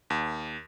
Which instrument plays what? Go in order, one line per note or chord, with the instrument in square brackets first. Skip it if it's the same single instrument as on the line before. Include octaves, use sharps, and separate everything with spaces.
[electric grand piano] D#2